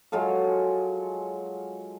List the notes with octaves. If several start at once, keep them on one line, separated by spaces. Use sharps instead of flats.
F#3 G#3 F4 A4